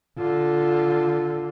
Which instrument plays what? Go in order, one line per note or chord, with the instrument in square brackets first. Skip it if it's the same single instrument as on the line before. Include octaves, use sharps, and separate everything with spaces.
[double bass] D3 [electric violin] F4